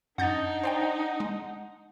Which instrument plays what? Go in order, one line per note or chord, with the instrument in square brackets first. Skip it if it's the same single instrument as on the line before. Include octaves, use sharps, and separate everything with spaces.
[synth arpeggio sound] F#2 G6 A6 [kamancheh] D4 D#4 [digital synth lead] F#5
[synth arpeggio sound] C5 D5 G5
G#3